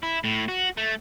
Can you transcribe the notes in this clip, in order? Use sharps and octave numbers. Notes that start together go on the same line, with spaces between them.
E4
A2
F#4
A3